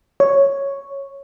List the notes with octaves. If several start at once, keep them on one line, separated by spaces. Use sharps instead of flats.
C#5